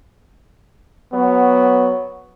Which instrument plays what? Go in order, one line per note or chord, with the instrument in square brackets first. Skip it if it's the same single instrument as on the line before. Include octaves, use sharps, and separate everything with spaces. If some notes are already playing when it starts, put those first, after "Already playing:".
[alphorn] F#3 [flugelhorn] B3